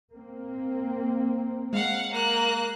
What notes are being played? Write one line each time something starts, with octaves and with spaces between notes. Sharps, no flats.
A#3 C4
G#3 F5 F#5
A#3 F#6